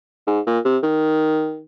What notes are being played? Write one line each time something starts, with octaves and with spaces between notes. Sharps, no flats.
G#2
A#2
C3
D#3